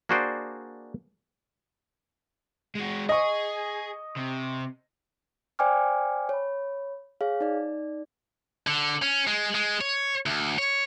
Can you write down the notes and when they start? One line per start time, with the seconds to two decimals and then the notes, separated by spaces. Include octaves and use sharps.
0.09 A#3 D4 F#4 G#4 C5 D5
2.75 G#3 F#4
3.09 G#4 D#5 C#6
4.16 C3
5.59 C5 D5 G5 G#5 D6 F6
6.29 C#5 B5
7.21 G#4 C#5 F5
7.40 D#4 D5
8.67 D3
9.02 C#4
9.27 G#3
9.55 G#3
9.81 C#5
10.26 D2
10.58 C#5